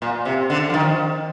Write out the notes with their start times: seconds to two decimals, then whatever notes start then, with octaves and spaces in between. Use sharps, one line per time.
0.02 A#2
0.25 C3
0.50 D3
0.70 F3
0.74 D#3